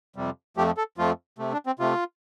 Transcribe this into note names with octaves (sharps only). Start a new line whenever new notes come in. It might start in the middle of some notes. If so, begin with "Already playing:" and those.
F2 C3 G3
F2 F3 A3 G4
A4
F2 F3 A3 F4
C3 A3
D4
C4
C3 A3 F4